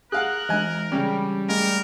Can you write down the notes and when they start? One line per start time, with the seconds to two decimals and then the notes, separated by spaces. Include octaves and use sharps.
0.12 G#4 A#4 F5 F#5 D#6 F#6
0.49 E3 G#3 D4 D#5 G#5
0.92 C#3 G3 C#4
1.49 G#3 A3 A#4